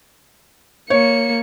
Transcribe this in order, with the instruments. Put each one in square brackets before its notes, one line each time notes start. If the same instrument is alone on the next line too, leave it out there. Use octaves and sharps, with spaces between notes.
[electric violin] A#3 C#7 [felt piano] C#5